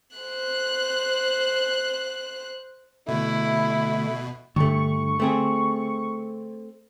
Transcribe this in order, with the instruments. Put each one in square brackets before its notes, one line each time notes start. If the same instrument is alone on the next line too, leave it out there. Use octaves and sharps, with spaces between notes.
[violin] C5 F#6
[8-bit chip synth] B2 [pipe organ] D3 A3 [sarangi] E4
[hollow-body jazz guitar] G2 A3 [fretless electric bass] D3 [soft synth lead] C#6
[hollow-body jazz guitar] A3 C4 G#4